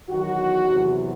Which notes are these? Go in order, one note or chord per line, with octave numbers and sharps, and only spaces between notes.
E2 D#3 F#3 F#4
E2 C3 F#3